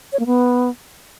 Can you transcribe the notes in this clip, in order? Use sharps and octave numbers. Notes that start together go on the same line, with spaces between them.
C#5
A#3
B3